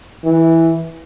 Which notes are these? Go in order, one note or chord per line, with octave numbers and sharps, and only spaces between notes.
E3